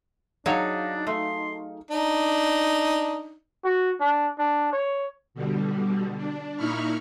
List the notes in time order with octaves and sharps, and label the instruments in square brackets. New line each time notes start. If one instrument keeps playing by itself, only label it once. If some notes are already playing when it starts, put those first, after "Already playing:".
[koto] F#3 C#5 [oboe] D4 [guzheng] D#4 [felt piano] G#4 D#5 F5
[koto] A3 [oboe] C6
[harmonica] D4 D#4
[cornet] F#4
D4
D4
C#5
[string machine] B2 D3 G3
D4
A#2 D#4 E4 B5 C#6 F6